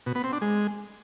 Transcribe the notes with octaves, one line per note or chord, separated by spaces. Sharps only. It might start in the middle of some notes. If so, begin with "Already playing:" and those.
B2
B3
C4
D4
G#3